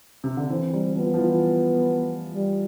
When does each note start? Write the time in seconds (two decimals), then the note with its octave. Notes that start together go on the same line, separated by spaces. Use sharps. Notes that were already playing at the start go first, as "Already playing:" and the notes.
0.24 C3
0.37 D3
0.50 E3 C4
0.73 G3
0.96 F3 B3
1.14 F3
1.19 E3
2.34 G3